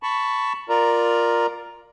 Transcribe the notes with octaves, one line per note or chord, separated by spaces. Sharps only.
A5 B5 C#6
F4 A#4 D5 A#5